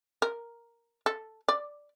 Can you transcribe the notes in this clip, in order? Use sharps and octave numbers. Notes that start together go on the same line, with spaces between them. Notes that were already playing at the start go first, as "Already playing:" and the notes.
A#4
A4
D5